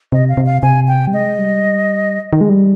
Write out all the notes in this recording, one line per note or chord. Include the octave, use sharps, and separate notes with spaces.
C3 D#5
F5
C3
F5
C3 G#5
G5
G3
G#3 D#5
G3
D#3
G#3
G3